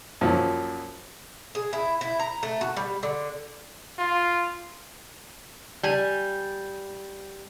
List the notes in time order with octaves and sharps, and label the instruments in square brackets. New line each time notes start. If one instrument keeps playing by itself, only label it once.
[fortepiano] F#2 A#2 F3 C#4
[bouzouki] G#4
E4
E4
A#5
A3
F#4
G3
D3
[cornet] F4
[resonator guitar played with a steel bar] G3 G#5